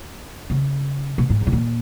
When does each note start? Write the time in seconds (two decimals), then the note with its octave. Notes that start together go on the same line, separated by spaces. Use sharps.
0.50 C#3
1.18 B2
1.30 G#2
1.41 E2
1.47 B2
1.52 A#2